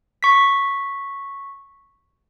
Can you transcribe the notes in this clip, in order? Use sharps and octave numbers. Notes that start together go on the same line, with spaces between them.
C#6 B6